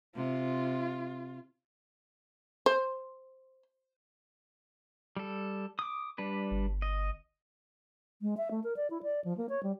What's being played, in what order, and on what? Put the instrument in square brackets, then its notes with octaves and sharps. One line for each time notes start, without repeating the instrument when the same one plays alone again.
[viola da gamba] C3 [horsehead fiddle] F4
[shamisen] C5
[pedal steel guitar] G3 A4
D6 D#6
G3 D4 B4
[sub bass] G1
[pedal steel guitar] D#5
[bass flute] G#3
E5
A3
A#4
D5
E4
D5
F3
A#3
C#5
G3